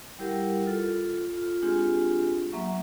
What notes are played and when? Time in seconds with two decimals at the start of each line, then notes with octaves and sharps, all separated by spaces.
0.19 G3 E4 G4 A#4 F#5
0.67 F4 A4
1.36 F4
1.62 G#3 C4 D4 F4 G4 G#4
2.52 F#3 A#3 E5 F#5 C#6